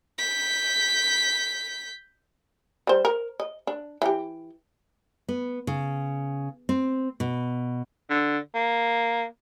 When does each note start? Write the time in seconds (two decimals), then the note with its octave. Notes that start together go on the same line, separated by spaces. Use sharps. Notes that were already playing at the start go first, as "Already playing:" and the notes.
0.18 G6 B6
2.87 G3 C5
3.05 A#4
3.40 D#5
3.67 D4
4.02 E3 G4
5.29 B3
5.67 C#3
6.69 C4
7.20 B2
8.10 D3
8.54 A#3